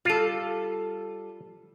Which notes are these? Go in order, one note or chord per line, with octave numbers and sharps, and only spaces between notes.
G3 F4 A4